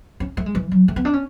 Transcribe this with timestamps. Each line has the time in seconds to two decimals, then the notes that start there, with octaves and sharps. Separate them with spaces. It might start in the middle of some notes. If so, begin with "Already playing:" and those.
0.20 C#4
0.37 A3
0.46 G#3
0.55 E3
0.72 F#3
0.88 A3
0.96 B3
1.05 D4
1.13 C#4